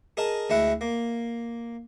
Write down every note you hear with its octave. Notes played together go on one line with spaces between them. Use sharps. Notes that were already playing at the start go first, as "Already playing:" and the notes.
G#4 A#4 D#5 A5
D2 G#3 E4 F#5
A#3